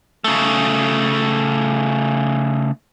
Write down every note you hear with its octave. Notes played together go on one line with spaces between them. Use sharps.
C#3 A3